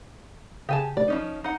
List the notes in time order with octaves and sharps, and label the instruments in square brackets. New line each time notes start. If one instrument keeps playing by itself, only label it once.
[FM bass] C#3 [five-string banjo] G4 G#5 A5
[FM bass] F1 [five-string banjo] D5
[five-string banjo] F3 C#4 D#4
D#4 F#5